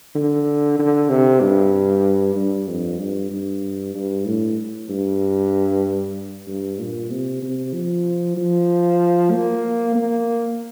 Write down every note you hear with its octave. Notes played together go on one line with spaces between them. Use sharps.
D3
D3
C3
G2
G2
F2
G2
G2
G2
A2
G2
G2
A#2
C3
C3
F3
F3
A#3
A#3